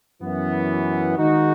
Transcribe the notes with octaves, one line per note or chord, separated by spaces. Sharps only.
F#2 E3 B3
D#3 G#3 D#4 F#4